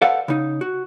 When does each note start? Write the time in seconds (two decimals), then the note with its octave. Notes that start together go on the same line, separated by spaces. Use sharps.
0.02 A4 B4 C5 D5 F5 F#5
0.28 C#3 D#4
0.61 F#4